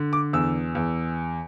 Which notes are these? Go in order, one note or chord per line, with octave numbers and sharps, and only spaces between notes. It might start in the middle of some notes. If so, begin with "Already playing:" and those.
Already playing: D3
D6
E2 E6
E2